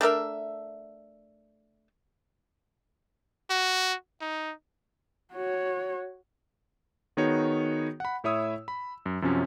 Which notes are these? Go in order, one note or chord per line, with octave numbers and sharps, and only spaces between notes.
A3 D4 A#4 E5
F#4
D#4
F#4 C#5
D#3 B3 D#4 F#4 G#4 C#5
F#5 B5
A2 E4 C#5 E5 D#6 E6
B5
F#2
F#2 C3 F3 F#3 C#4